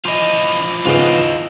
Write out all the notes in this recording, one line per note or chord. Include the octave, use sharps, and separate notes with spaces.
E3 F3 F4 D#5
G#2 C#3 B3 F4 D#5